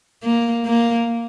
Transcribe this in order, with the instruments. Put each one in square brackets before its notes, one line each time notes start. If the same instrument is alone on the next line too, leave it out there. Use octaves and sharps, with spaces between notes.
[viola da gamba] A#3
A#3